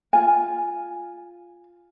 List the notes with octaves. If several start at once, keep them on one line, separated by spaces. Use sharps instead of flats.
F4 G#5